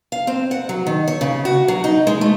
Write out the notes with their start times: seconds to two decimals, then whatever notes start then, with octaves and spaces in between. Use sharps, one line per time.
0.12 F5
0.27 C4
0.51 F#5
0.69 F#3
0.87 D#3
1.08 C#5
1.21 C#3
1.45 F#4
1.68 F#3
1.84 D#4
2.07 G#3
2.21 A3